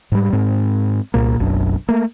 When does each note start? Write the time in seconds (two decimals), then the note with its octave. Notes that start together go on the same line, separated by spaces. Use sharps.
0.12 G#2 G3
0.33 G#2 C4
1.14 C2 A#2 A#3
1.40 F#1 B1 F#2 D4
1.89 A3 A#3